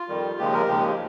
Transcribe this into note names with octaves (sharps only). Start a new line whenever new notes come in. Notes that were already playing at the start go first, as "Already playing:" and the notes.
Already playing: F4
F2 D#3 G3
D#2 C#3 F3 G#3 G4
A#4
D#2 C#3 F3 G#3 G4